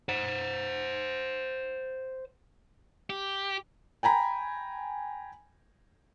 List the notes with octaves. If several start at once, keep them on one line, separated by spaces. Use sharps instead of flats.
C5 F#5
G4
G5 G#5 A#5 B5